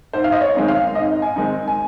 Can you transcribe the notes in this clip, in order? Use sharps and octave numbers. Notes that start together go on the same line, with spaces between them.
G#2 C5
F5
D#5
C#5
D#3 G#3 C4 D#4
F5
G#2 D#5
G#5
D#3 G#3 C4 D#4
G#5